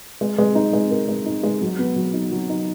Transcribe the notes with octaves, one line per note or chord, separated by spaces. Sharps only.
G#3
G#3
D#4
G#3
A#4
G#3
D#4
G#3
F#3
B3
F#3
D#4
F#3
D#4